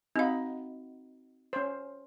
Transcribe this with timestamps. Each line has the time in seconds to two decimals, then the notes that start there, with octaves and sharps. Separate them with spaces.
0.16 C4 D#4 F#4 F5 B5
1.53 C#4 C5